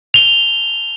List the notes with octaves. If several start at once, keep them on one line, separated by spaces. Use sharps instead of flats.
F7 G7